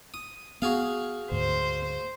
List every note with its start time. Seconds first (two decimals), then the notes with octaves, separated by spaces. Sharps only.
0.14 D#6
0.62 B3 F#4 G#4 F5
1.32 D2 G#2 C5